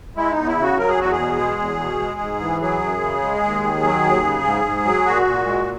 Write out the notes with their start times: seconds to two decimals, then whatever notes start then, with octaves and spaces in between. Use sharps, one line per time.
0.16 G#3 E4
0.31 D#4
0.37 E2
0.47 E4
0.57 C#3 F#4
0.77 F#3 A#4
0.88 G#4
0.98 E2 F#4
1.12 G#4
1.18 B2
1.39 G#3
1.59 E2
1.80 B2
2.00 G#3
2.20 G#2
2.40 E3
2.60 F#3 G#4
2.82 F#2
3.01 C#3
3.22 G#3
3.43 D#2
3.63 D#3
3.83 F#3
4.03 D#2
4.24 C#3
4.44 G#2
4.64 G#2
4.85 F#3
5.06 A#2 F#4
5.26 A#2
5.46 G#3